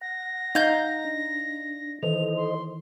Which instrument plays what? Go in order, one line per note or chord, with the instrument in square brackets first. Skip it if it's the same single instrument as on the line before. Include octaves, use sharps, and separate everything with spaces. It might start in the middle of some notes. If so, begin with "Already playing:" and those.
[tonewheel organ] F#5 [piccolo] A#6
[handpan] D#4 [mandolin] F5 G6
[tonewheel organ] D4
[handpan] D#3 E3 [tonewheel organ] A4 C5 D#5 [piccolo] F7
[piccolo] C6